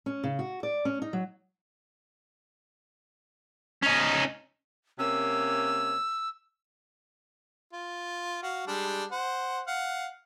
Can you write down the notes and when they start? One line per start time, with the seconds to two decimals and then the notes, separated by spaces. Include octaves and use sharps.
0.06 C#4
0.24 C#3
0.39 F#4
0.63 D5
0.85 C#4
1.02 D#4
1.13 F#3
3.82 C#4 D#4
4.99 C3 A#3 C#4 E6
7.73 F4
8.43 F#4 F5
8.67 G3 G#3 D4
9.11 C5 F#5
9.67 F5 F#5